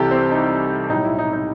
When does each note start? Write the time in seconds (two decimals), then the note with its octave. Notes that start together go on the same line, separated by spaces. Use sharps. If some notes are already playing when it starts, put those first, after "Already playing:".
Already playing: C2 C3 E3 G3 G4 A4
0.11 C4
0.32 D#4
0.89 B1 A2 G3 D#4
1.05 E4
1.19 D#4
1.33 D#4